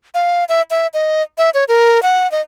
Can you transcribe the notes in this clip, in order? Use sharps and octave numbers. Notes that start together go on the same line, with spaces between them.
F5
E5
E5
D#5
E5
C#5
A#4
F#5
D#5